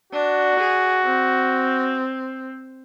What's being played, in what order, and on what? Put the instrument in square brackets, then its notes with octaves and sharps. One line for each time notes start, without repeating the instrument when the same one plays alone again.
[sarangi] D4 [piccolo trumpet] F#4
[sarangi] G#4
C4